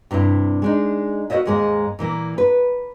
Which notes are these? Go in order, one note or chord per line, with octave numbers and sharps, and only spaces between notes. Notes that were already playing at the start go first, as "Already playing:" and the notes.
G2 C3 D4 E4
G#3 D4 D#4
F#4 A#4 C5 C#5 D#5 E5
D#2 G#2 G#3 A#3 D#5
A#2 E3 A#3
B4